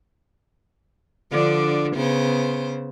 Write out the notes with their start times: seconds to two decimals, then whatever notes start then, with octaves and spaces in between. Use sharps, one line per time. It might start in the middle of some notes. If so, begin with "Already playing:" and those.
1.31 D3 F3 D4
1.96 C#3 B3 C5